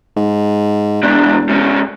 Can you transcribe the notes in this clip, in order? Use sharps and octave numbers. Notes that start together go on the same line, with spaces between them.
G#2
E1 E2 D4
G#2 C#4